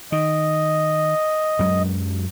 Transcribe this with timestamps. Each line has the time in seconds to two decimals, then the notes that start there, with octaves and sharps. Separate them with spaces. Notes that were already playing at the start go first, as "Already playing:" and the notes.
0.12 D#3 D#5
1.59 F#2 F#3 G#3